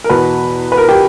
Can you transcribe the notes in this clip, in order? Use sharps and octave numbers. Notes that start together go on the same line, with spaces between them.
A#4
E2 B2 B4
B4
A#4
G4